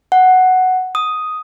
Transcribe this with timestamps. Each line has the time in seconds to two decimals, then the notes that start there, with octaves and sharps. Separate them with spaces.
0.12 F#5
0.95 D#6